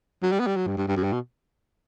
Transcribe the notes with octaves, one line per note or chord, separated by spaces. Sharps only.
F#3
G3
B3
G3
F#3
G2
G2
G2
F#2
G2
B2